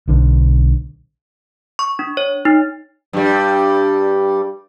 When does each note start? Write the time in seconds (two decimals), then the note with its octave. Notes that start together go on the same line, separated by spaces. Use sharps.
0.08 B1 D3
1.79 C#6
1.99 D4
2.17 C#5
2.45 D#4
3.13 G2 G3